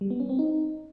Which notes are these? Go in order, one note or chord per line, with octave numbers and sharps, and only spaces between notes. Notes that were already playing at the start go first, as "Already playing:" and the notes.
G3
B3
C#4
C4
D#4